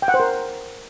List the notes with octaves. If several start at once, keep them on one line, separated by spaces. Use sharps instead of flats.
G5
F#5
C5
A#4